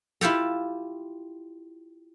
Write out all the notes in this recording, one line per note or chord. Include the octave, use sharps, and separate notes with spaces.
E4 F4 G4 A4